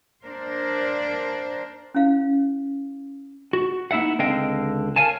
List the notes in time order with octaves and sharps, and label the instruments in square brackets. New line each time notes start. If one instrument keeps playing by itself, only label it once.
[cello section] A#3 D4 A#4 C5
[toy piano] C#4 E4 F5
[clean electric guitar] F#4
A#3 D#4 E4 E5 F#5
C#2 D3 C4 D#5 F5 G5
A#4 C#5 F5 G#5 A5